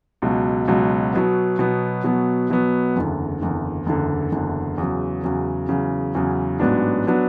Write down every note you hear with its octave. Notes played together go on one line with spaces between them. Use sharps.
C#2 B2 F#3
C#2 B2 F#3
B2 F#3 B3
B2 F#3 B3
B2 F#3 B3
B2 F#3 B3
F#1 E2 D3
F#1 E2 D3
F#1 E2 D3
F#1 E2 D3
E2 C#3 F#3
E2 C#3 F#3
E2 C#3 F#3
E2 C#3 F#3
A1 G#2 F#3 B3 D4
F#3 B3 D4